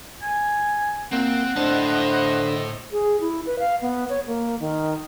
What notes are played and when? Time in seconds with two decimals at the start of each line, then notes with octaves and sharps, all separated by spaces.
0.22 G#5
1.12 A#2 C4 F#5
1.56 A2 D3 C5 D#5 A5
2.92 G#4
3.20 E4
3.46 B4
3.59 F5
3.82 B3
4.09 C#5
4.27 A#3
4.60 D#3